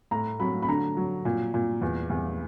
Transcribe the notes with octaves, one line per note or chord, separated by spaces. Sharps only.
A2 A#5
F#3 B5
B5
D3 A#5
F#3
A#2
A#2
E2
E2